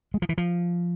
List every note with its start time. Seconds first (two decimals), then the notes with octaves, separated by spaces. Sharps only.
0.14 G#3
0.22 F3
0.29 E3
0.38 F3